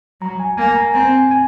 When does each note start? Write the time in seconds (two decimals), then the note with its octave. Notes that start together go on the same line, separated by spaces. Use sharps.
0.21 F#3 A#5
0.40 G#5
0.57 A#3 G#5
0.76 A#5
0.94 C4 G#5
1.31 G#5